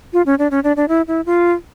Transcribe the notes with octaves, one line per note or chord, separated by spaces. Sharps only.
F4
C#4
D4
C#4
D4
D4
E4
E4
F4